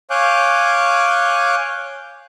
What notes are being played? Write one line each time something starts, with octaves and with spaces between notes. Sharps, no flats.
C#5 F5 G#5 D6 F#6 G6